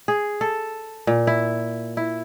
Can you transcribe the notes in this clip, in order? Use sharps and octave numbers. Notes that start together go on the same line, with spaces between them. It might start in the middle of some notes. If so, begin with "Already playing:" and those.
G#4
A4
A#2
E4
E4